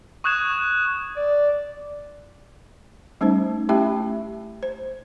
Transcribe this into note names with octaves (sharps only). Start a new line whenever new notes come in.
C#6 D#6 F#6 G#6 E7
D5
G3 A3 C#4 D#4 C5
A3 C#4 E4 G4 E5 G5
C5